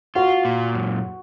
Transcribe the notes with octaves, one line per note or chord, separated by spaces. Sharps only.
F4 F#4
A#2
F#2